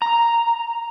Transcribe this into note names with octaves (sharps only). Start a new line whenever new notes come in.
A#5